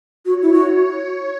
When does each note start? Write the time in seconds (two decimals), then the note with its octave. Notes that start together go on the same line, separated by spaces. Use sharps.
0.25 F#4 C#5
0.42 E4
0.53 F#4